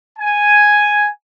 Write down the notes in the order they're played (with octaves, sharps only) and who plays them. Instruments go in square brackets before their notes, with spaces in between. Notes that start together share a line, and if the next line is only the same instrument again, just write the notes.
[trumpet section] G#5